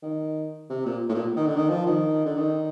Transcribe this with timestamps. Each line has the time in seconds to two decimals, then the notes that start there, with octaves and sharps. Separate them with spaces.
0.03 D#3
0.70 C3
0.86 A#2
1.09 A2
1.15 A#2
1.36 D#3
1.47 D3
1.56 D#3
1.69 F3
1.87 D#3
2.25 D3
2.37 D#3